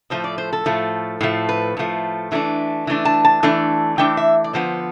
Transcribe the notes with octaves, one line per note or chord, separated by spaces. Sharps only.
A2 F3 A3 C5
D5
C5
A4
A2 F3 A3
A2 F3 A3
B4
A2 F3 A3
E3 A3 D4
E3 A3 D4
A5
A5
E3 A3 D4
E3 A3 D4 G5
E5
D5
D3 F3 B3 C5